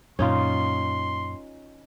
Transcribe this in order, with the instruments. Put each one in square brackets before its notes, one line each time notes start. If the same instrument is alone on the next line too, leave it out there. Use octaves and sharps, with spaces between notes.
[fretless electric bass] F#2 A#2 [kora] C#4 D#4 F4 [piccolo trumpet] C6